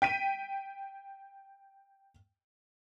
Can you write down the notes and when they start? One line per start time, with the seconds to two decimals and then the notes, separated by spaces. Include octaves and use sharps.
0.02 G5 B6 D#7